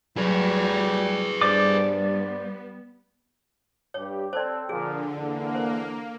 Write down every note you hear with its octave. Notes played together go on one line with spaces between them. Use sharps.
F#3 G3 A3 G#4 B4
G2 G3 B3 C5 D5 D6
G2 G4 C#5
C4 A4 C5 D5
A#2 D3 F3 G#4
E2 D3 A#3
C5